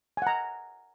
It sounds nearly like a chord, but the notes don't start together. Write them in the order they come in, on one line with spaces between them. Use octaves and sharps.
G#5 F#5 A#5